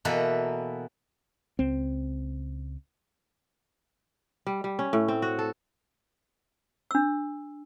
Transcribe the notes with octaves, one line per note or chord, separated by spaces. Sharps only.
B2 E3 A#3 A4 B4
C#2 C4
G3
G3
C#4
A2
C4
F#4
A4
D4 E6